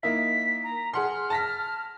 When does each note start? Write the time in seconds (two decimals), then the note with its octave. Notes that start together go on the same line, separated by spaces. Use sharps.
0.03 A#3 D#4 E4 B6
0.64 A#5
0.94 G#4 F#5 C6 F6
1.30 A5 A#6 B6